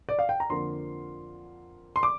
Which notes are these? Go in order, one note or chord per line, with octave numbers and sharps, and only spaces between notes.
D5
F5
G5
A#5
F2 D3 F3 A#3 C6
C6
D6